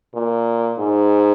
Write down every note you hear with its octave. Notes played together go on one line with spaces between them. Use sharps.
A#2
G#2